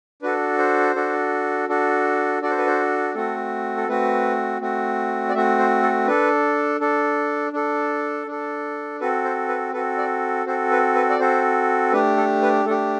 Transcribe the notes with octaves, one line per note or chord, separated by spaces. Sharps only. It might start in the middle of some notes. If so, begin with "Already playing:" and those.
D4 F#4 A4 B4
C5
D4 F#4 A4
D4 F#4 A4
D4 F#4 A4 D5
C5
B4
C5
A3 C4 F#4 A4
A4
A3 C4 F#4 B4
A3 C4 F#4
D5
A3 C4 F#4 E5
C5
A4
D4 A4 B4
D4 A4
D4 A4
D4 A4
C4 F#4 A4 B4
C5
B4
C4 F#4 A4 B4
D5
C4 F#4 A4 C5
B4
B4
D5
C4 F#4 A4 C5
A3 D4 G4 B4
A4
B4
A3 D4 G4 A4